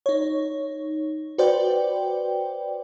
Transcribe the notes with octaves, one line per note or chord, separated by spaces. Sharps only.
D#4 C#5
F#4 B4 C5 D5 G5